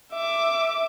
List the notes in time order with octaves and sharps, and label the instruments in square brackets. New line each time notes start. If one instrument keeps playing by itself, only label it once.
[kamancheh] E5 D6